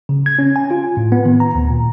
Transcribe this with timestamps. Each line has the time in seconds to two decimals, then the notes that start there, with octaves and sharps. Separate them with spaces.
0.09 C#3
0.26 G#6
0.39 C#4
0.56 G#5
0.71 F4
0.97 A2
1.12 B3
1.25 D#3
1.40 A#5
1.55 D2
1.70 A#2